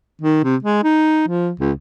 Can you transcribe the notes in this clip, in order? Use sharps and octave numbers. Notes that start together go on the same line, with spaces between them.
D#3
C3
G#3
D#4
F3
C#2